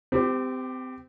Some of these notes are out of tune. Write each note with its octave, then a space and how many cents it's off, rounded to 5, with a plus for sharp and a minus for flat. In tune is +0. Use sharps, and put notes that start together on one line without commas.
C4 -30 G4 +10